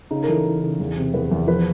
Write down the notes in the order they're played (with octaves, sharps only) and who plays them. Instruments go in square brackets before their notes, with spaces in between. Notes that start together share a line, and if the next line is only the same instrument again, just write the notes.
[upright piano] C#3 D#4
A#4
E3 A4
E3
C#3
E2
C3
E2 B4
E2
F3 B4